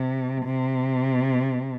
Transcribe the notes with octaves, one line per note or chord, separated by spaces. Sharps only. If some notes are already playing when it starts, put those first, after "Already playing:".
Already playing: C3
C3